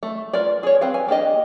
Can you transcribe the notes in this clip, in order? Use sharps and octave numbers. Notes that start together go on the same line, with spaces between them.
A3
F4 A#4 B4 D5
G#4 C#5
C4 B4 F5
G#5
A#3 D4 G4 D#5